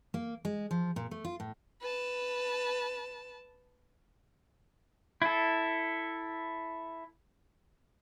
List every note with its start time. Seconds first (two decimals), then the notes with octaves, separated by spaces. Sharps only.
0.14 A#3
0.45 G#3
0.71 F3
0.96 A#2
1.11 A3
1.25 F4
1.40 A2
1.81 B4 A5
5.22 E4 A4